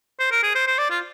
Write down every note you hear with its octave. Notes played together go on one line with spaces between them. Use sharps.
C5
A#4
G#4
C5
C5
D5
F4